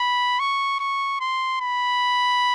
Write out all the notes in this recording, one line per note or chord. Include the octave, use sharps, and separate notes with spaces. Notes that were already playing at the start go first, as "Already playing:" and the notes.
Already playing: B5
C#6
C#6
C6
B5